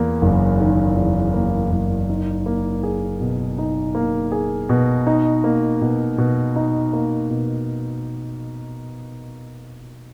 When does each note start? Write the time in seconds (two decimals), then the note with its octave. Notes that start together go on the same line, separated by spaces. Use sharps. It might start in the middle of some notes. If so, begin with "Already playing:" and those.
Already playing: E2 A#3
0.22 F#1
0.60 D#3
0.97 E2
1.34 A#3
1.72 F#1
2.09 D#4
2.46 A#3
2.83 G#4
3.21 B2
3.58 D#4
3.95 A#3
4.32 G#4
4.69 B2
5.07 D#4
5.44 A#3
5.81 B2
6.18 B2
6.56 D#4
6.93 A#3
7.30 B2